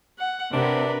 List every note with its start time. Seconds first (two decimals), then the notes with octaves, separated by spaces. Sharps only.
0.18 F#5
0.53 C3 D4 A#4 B4